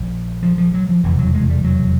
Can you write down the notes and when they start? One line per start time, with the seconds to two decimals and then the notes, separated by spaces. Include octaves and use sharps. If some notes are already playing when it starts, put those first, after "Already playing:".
Already playing: A#1 A#2
0.43 F3
0.58 F3
0.74 F#3
0.89 F3
1.04 F1 E2 B2 E3
1.19 F#3
1.34 G#3
1.49 G3
1.64 F#3